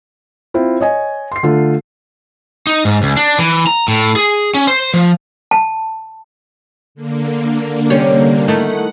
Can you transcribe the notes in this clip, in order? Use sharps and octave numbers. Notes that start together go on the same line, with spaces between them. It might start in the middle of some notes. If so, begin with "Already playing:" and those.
C4 E4 F4
C#5 D#5 G#5
C6 C7
D3 A3 F4
D#4
G#2
C#2
D4
E3
A#5
A2
G#4
C#4
C5
F3
A5
D3 A#3
C3 G3 C#4
D#3 A3 E4 F#5